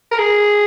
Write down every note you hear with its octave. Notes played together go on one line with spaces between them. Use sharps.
A#4
G#4